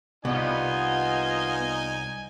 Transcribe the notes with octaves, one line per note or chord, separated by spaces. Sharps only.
C2 B3 D#4 F4 D#5 G#5